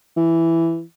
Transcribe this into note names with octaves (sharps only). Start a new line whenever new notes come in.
E3